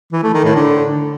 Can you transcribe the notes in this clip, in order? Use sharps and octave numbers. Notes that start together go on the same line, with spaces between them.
E3
A3
D#3
A2
D3